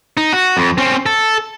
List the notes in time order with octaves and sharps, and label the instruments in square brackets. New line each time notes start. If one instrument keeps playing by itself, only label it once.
[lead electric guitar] D#4
F#4
F2
C4 C#4
A4